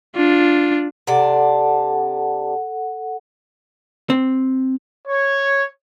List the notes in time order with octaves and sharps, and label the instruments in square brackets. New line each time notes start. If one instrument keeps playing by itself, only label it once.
[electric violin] D4 F4
[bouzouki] C3 D4 [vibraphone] A4 F#5
[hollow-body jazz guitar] C4
[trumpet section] C#5